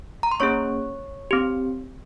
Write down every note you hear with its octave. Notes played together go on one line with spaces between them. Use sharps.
A#5
C6
A#3 C#4 G#4 C#5 C#6
C4 G4